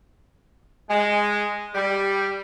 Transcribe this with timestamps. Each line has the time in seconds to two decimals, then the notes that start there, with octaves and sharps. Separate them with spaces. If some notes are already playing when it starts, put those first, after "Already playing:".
0.89 G#3
1.74 G3